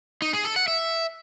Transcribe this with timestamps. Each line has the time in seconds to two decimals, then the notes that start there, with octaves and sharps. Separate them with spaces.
0.22 D#4
0.33 G#4
0.45 A4
0.56 F#5
0.68 E5